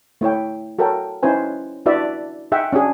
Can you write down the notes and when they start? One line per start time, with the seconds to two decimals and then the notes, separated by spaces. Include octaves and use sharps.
0.21 A3 E4 C#5 G5
0.79 F#4 A4 A#4 C#5 G5
1.23 C#4 D#4 E4 B4 C5 G#5
1.86 D4 E4 F#4 B4 D5 E5
2.52 D#4 G#4 E5 F#5 G5
2.73 C#4 D4 F#4 G#4